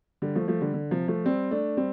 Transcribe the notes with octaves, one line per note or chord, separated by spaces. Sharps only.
D3 G3
F3 A3
F3 A3
D3 G3
D3
C3 F3
F3 A3
G3 C4
A3 D4
G3 C4